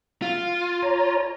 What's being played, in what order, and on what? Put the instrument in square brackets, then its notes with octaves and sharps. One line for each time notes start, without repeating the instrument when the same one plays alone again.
[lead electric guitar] F4
[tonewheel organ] C#5 A#5